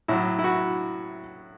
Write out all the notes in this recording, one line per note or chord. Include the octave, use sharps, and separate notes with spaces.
A2 F#3 E4
E4
F#4